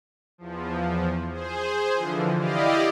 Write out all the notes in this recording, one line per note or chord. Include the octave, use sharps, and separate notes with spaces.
E2 F3
G#4 C5
D3 E3 F3
E4 G4 D5 D#5 F5